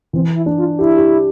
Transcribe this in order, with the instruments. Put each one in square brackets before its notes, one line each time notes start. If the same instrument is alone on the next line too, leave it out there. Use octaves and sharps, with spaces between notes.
[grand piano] E3 [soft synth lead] C4
[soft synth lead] E4
[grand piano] D4
[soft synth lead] F4
[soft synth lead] E4 [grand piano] G4
[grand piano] G4